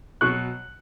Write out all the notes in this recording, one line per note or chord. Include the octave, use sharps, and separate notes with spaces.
B2 F#3 C#6 F#6